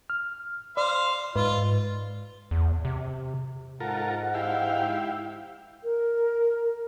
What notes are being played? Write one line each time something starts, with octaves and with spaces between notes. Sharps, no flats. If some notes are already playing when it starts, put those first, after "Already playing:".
F6
C5 D5 F5
G#2 F4 B4
E2
C3
G#2 F4 A4 A#4 F#5
E4 G4 F5 G5
A#4